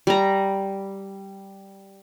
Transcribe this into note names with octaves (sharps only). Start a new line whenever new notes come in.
G3 A#5